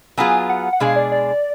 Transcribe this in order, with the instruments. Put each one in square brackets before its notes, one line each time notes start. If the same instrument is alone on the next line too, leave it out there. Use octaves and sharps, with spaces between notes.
[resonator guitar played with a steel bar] F#3 B3 F4 G#4 [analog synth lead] G#5
[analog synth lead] F#5
F#5
[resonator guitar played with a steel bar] B2 G#3 D4 G#4 [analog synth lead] F5
[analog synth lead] D5
D5